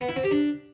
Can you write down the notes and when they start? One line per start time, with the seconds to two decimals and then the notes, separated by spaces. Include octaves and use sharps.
0.01 B3
0.09 E4
0.16 C4
0.24 G4
0.31 D4